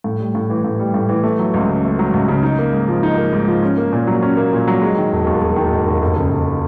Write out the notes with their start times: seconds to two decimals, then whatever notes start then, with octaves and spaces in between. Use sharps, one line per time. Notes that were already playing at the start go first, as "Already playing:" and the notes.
0.04 A2
0.20 G3
0.35 A2
0.50 E3
0.65 A2
0.79 G3
0.94 A2
1.09 E3
1.24 A3
1.39 F#3
1.54 C#2
1.69 C#3
1.84 A3
1.99 F#3
2.14 C#2
2.28 C#3
2.43 D#4
2.59 A#3
2.73 G#2
2.88 F3
3.03 D#4
3.18 A#3
3.33 G#2
3.48 F3
3.62 C#4
3.78 A#3
3.92 A#2
4.07 F#3
4.23 C#4
4.37 A#3
4.53 A#2
4.67 F#3
4.82 G#3
4.97 D#3
5.12 E1
5.27 D#2
5.42 G#3
5.56 D#3
5.72 E1
5.87 D#2
6.02 F1
6.16 C#3
6.31 F1